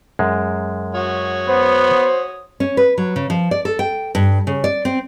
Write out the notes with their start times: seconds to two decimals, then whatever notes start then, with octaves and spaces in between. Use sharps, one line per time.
0.19 F#2 G#3
0.95 F#4 C#5 D#6
1.48 B3 C5
2.60 C#4
2.77 B4
2.98 F#3
3.16 C#3
3.30 F3
3.51 D5
3.65 A4
3.79 G5
4.15 G2
4.47 C#3
4.64 D5
4.85 C4